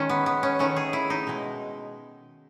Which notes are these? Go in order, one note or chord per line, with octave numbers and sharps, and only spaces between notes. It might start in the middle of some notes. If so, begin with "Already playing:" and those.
Already playing: D#3 G#3 C#4
B3
B3
C#4
D#3 A3 C#4
G#4
E4
D#4
B2 G#3